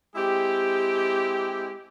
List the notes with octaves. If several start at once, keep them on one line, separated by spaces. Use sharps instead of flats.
G#3 C4 E4 G4